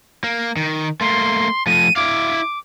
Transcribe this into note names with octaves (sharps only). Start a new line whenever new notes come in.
A#3
D#3
A3 A#3 C6
F3 A3 D#7
E4 F5 D6